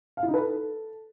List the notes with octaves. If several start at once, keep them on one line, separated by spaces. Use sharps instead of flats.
F5
E4
D#4
B4
A4